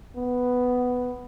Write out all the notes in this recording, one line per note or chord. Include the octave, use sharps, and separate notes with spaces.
B3